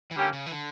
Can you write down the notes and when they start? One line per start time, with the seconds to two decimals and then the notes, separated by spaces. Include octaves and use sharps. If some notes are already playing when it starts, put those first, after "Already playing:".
0.11 E3
0.16 D3 G3 A#3 C#4 G4
0.33 C#3
0.46 E3
0.52 D3